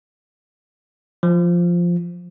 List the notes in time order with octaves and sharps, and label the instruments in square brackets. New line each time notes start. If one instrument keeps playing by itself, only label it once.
[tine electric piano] F3